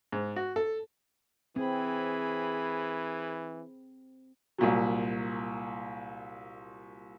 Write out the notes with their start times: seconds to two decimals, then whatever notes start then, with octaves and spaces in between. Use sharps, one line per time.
0.12 G#2
0.36 F#4
0.56 A4
1.56 E3 C4 G#4 B5
4.58 C2 A#2 F#3